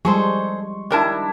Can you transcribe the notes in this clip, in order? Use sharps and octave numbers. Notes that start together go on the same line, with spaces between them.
F3 G3 G#3 G#4 A4 C5 C6 C#6
D#3 G3 D4 E4 A#4 A5